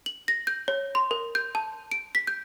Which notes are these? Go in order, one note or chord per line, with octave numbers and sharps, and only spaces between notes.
F#7
A#6
G6
C#5
C6
A#4
G6
A5
D7
B6
G6